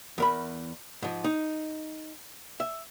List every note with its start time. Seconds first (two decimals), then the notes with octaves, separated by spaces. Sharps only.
0.18 E2 A#4 B5
1.02 G#2 F3
1.24 D#4
2.60 E5